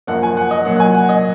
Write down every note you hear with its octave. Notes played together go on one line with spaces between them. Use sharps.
F#2 F3 A#3 F#5
G#5
F#5
D#5
A#2 F#3 A#3 F#5
F#5
G#5
F#5
D#5